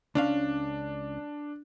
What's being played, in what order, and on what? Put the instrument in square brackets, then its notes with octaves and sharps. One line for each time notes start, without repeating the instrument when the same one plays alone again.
[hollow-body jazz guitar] C#2 C#4 F5 [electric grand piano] D4